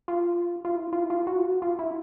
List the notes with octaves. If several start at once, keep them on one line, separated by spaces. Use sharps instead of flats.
F4
F4
E4
F4
E4
F4
F#4
F4
F#4
F4
E4